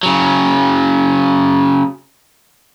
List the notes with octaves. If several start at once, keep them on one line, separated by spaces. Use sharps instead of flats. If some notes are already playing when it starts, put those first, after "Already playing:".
C#3 F#3